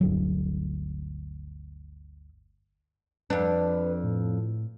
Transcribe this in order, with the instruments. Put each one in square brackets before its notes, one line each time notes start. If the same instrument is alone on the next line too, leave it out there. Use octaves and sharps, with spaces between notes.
[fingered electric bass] G1 D2 F#3
[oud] F2 D4 [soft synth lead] B4
[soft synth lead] A2